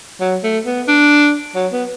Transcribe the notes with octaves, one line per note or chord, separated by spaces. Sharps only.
F#3
A3
B3
D4
F#3
B3